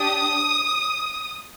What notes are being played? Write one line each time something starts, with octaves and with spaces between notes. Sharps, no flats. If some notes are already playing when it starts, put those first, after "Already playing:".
Already playing: D4 G4 D#6